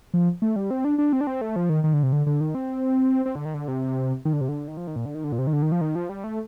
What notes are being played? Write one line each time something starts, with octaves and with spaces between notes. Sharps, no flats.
F3
A3
G3
C4
D4
D4
C4
D4
C4
A3
F3
D#3
D#3
D3
C3
D3
D3
D#3
C4
C4
D3
D#3
D3
C3
D#3
D3
C3
D3
D#3
F3
D#3
A#2
D3
D#3
D3
A#2
C3
D#3
D3
D#3
F3
D#3
F3
G3
A3